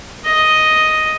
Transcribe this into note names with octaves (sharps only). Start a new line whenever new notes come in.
D#5